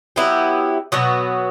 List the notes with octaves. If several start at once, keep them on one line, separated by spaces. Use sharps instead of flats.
F#3 B3 E4 G4
B2 F#3 B3 F#4